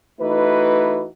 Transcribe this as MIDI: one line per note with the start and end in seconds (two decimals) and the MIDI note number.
0.20 1.05 52
0.20 1.05 57
0.20 1.05 63
0.20 1.05 66
0.20 1.05 71